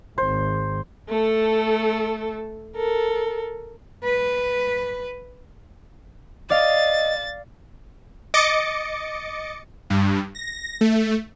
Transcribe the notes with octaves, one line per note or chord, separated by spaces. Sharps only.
G#1 C5
A3 A4
A4 A#4
B4
D5 D#5 F5 A6
D#5 D6 A6 C#7
G2
A#6
A3